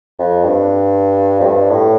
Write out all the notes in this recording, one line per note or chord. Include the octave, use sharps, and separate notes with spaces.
F2
G2
F2
G2
A2